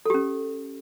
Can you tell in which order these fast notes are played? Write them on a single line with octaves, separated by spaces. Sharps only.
A4 G4 C#4